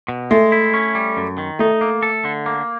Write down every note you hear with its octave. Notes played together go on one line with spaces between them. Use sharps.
B2
G#3 A3
E4
C#4
G3
F#2
D#3
A3 D#4
A#3
A4
D3
A#3